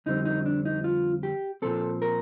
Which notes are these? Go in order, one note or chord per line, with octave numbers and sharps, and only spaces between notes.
F2 D3 G3 C4 D#4
D#4
D4
D#4
F4
G4
A#2 F3 C4 A4
A#4